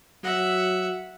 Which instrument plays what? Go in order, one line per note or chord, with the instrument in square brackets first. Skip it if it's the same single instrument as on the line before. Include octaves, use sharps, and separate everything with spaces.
[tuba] F#3 [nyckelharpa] E5 F#5